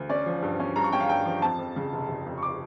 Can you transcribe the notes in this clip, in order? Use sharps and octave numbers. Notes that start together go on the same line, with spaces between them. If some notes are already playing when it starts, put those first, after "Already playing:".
Already playing: D2
C#4 D5
F3
G2
C#4
G2 A#5
C#6
C#4 G5
F5
G2 G5
F3
F2 A5
F2
C#3
F1
F1
F2
C#6
D6